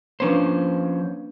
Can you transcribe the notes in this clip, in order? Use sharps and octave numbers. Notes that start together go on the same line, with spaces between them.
F3 A#3 C#4 D4 B4 C5